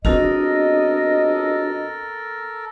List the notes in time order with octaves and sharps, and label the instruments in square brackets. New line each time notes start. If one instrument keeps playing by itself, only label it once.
[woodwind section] C#2 D#5 [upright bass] B3 C4 [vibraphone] D4 F#4 [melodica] A4 A#4